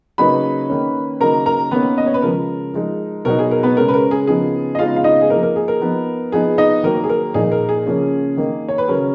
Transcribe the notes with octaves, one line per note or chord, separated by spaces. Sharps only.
C#3 F#3 A#3 D#4 B4 B5
D#3 A#3 C#4
C#3 F#3 A#3 D#4 A#4 A#5
A#4 A#5
D#3 A#3 B3 C#4 B4
D#5
C#5
B4
C#3 F3 G#3 A#4
F3 G#3 D#4
B2 F#3 B3 D#4 A#4
G#4
A#4
B3 B4
C#3 G#3 C#4 A#4
B4
A#4
G#4
C#3 F3 B3 D#4 G#4
D#5
C#3 G#3 B3 D#4 F4 F5
F5
D#4 D#5
G#4
F3 A#3 D#4 A#4
A#4
G#4
A#4
F3 B3 D#4
F3 B3 D#4 G#4
D#4 D#5
D#3 F#3 A#3 A#4
G#4
A#4
A#2 F3 A#3 D#4 G#4
A#4
G#4
C#3 F3 A#3 C#4
D#3 A#3 D#4
C#5
B4
C#3 F#3 C#4 A#4